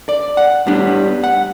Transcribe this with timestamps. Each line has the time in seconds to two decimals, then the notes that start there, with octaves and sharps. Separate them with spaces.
0.09 D5
0.37 F#5
0.67 A2 G3 B3 D4
1.24 F#5